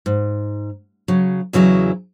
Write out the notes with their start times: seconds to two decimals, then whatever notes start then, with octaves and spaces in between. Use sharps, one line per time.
0.06 G#2
1.08 C#3 F#3
1.53 E2 C#3 F#3 E4 D#5